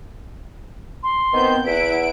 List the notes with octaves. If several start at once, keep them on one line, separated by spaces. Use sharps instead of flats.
C6
D#3 B3 C4 G6
E2 E4 F#5 B6 D7